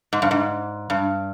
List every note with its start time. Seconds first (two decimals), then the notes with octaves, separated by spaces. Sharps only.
0.13 G#2
0.22 G2
0.31 G#2
0.90 G2